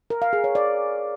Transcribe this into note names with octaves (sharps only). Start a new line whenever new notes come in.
A#4
F5
G#4
C#5
D5